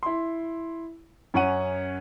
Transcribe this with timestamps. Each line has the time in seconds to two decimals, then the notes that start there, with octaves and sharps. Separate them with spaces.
0.03 E4 C6
1.34 F#2 C#4 C#5 F#5 D#7